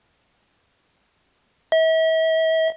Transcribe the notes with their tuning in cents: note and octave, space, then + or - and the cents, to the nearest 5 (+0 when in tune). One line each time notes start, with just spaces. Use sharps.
E5 -40